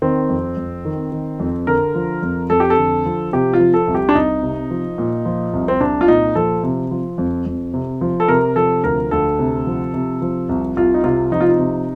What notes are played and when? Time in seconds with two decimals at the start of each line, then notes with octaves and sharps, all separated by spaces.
0.02 D#3 C4
0.30 F2
0.57 F2
0.85 D#3
1.12 D#3
1.40 F2
1.67 D3 A#4
1.95 F3
2.22 F2
2.50 F2 A4
2.60 G4
2.70 A4
2.77 D3
3.06 F3
3.33 C3 G4
3.53 F4
3.60 F3
3.74 A4
3.88 C2
3.95 G4
4.09 D4
4.15 C2 D#4
4.43 C3
4.70 F3
4.98 A#2
5.25 F3
5.53 C2
5.68 C4
5.81 C2 D4
6.01 F4
6.08 A#2 D#4
6.35 F3 A4
6.63 C3
6.91 F3
7.18 F2
7.46 F2
7.74 C3
8.01 F3
8.20 A4
8.28 C3 A#4
8.56 F3 A4
8.83 D2 A#4
9.11 D2 A4
9.39 C3
9.66 F3
9.94 C3
10.22 F3
10.49 C2
10.76 C2 F4
10.94 D#4
11.04 C3 F4
11.32 F3 D#4
11.41 F4
11.49 D#4
11.59 C3